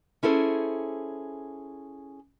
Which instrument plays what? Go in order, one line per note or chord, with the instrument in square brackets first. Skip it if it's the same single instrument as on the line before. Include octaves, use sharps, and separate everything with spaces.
[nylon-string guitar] C#4 E4 G#4 A4 C5